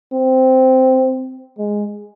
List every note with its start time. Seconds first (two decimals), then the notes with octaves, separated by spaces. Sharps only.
0.13 C4
1.59 G#3